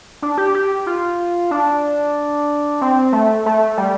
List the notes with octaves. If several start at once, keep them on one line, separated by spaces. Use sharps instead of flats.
D4
G4
G4
F4
D4
C4
A3
A3
G3